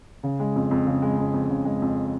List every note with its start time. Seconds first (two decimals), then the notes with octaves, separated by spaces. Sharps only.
0.23 C#3
0.40 G#3
0.56 F2
0.71 F2
0.87 C#3
1.02 G#3
1.18 F2
1.34 F2
1.49 C#3
1.65 G#3
1.82 F2